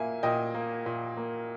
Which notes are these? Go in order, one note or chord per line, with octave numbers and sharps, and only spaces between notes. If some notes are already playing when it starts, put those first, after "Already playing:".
Already playing: A#2 A#3 E5 G#5
A#2 D#5 G5
A#3
A#2
A#3